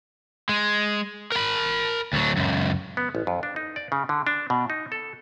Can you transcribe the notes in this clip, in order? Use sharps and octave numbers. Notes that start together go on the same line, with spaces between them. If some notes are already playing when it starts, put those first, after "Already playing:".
G#3
A#4 B5
D2 F#3
C#2 F#2
B3
A1
F2
D4
D#4
D5
C#3
D3
D4
B2
D#4
A4